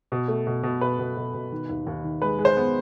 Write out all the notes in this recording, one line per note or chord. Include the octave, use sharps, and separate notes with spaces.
B2
A3
B2
B2
B2 B4
B2
B2
B2
D#3
D#2
D#2
D#3
G#3 B4
G#3
C5
B3